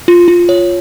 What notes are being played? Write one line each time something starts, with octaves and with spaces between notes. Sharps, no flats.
F4
F4
C#5